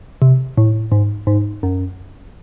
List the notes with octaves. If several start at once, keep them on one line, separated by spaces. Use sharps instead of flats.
C3
A2
G#2
G#2
F#2